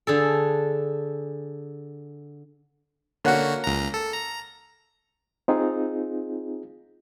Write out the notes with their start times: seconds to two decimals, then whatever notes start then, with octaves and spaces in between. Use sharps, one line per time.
0.07 D3 G#4 A4
3.24 D3 A#3 C#4 F#4 F#5
3.64 C#2 A#5
3.94 A4
4.13 A#5
5.48 C4 D#4 F4 G#4